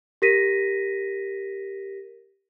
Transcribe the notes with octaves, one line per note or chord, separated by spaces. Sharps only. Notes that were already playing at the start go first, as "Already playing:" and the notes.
G4 A#4 A#6 B6 D#7